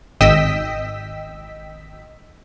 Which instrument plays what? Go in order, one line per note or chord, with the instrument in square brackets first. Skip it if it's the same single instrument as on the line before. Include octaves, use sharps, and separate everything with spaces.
[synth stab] G#1 D#5 G5 E6 B6